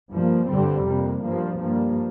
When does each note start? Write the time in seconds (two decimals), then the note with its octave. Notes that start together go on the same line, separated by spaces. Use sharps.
0.11 G2 F3 A#3
0.48 G2 D3 G3 C4
0.86 F2 C3 A#3
1.23 G2 F3 A#3
1.60 G2 F3 A#3